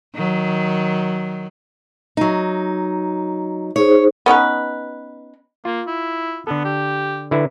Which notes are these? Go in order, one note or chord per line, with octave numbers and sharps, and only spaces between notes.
D#3 F#3
F#3 D#4
D#4 G#4 C5 C#5
B3 C#4 D#4 B4
A#3 F4
E4
D3 B3 A4
G4
D3 E4 B4